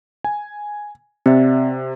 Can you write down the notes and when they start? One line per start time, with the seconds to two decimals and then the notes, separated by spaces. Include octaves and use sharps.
0.24 G#5
1.26 C3 C4 D5 E5